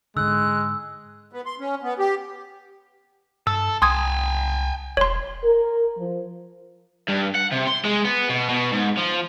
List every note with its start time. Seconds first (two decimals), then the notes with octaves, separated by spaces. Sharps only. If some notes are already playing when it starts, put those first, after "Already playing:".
0.17 G#2 D3 G#3 E6 F#6
1.33 B3
1.46 C6
1.60 C#4
1.82 B3
1.99 G4
3.47 G2 A4 E6
3.82 C2 G5 G#5 C6 D#6 G#6
4.97 E1 C#5 C6
5.44 A#4
5.98 F3
7.09 G2
7.35 F#5
7.52 C3
7.67 C6
7.85 G#3
8.05 B3
8.29 B2
8.49 B2
8.72 G#2
8.97 F3